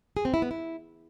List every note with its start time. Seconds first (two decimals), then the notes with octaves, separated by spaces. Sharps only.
0.17 G#4
0.25 C4
0.34 E4
0.42 B3
0.51 E4